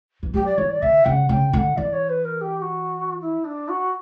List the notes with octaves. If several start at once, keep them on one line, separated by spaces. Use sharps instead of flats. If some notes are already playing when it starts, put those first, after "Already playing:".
E3
F#3 G4
D5
E3 C#5
D5
D3 E5
C#3 F#5 G5
C#3 G5
D3 F#5 G5
E3 D5
C#5
B4
A#4
G4
G4
F#4
E4
D4
F#4